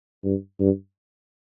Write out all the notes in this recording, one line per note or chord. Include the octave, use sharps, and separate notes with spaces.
G2
G2